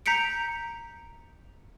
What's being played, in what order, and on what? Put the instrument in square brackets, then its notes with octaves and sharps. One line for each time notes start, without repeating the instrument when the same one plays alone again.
[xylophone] A#5 G6 B6 C#7 D7